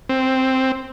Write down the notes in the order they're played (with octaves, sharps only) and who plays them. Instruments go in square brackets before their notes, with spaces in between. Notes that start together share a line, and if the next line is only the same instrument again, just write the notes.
[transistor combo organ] C4